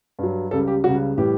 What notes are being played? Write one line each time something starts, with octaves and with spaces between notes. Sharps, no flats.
G2 F#3
C#2 C#3 G3 A4
G4
C#2 C#3 G3 F#4
A2 E3 G3 G4